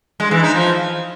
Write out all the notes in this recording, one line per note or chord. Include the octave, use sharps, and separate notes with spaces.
G#3
E3
D#4
F3